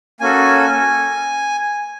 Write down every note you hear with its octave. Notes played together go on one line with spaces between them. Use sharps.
A#3 C#4 F#4 A4 G#5